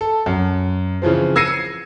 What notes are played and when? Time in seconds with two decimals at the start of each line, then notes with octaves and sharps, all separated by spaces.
0.01 A4
0.26 F#2
1.02 C#3 E3 F3 C4
1.36 E6 G#6 A#6 C7 C#7 D#7